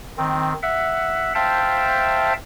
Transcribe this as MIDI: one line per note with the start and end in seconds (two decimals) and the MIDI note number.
0.18 0.53 51
0.18 0.53 60
0.63 1.33 76
0.63 1.33 78
1.35 2.33 72
1.35 2.33 76
1.35 2.33 77
1.35 2.33 79
1.35 2.33 81